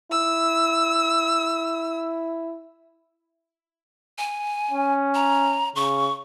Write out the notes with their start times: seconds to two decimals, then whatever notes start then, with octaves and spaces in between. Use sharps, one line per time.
0.11 E4 E6
4.18 G#5
4.71 C#4
5.15 A#5
5.76 C#3 C#6